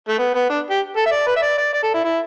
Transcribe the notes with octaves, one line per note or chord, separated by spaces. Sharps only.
A3
B3
B3
D4
G4
A4
E5
D5
B4
E5
D5
D5
D5
A4
E4
E4